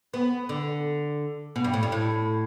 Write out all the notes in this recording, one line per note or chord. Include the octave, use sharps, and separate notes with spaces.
B3
D3
B2
G2
A2
G2
A2